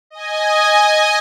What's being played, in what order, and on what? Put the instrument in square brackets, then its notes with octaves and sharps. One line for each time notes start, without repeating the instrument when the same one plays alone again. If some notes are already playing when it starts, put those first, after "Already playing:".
[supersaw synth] D#5 G#5